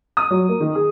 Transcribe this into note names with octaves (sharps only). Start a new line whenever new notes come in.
D#6
F#3
A#3
D#3
G#4